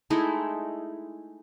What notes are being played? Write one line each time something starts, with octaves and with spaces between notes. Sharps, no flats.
G#3 A3 D#4 E4